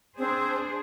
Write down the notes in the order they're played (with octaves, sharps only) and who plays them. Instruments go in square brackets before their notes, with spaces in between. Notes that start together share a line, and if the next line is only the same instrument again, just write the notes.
[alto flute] C4 [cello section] D4 G#4 C5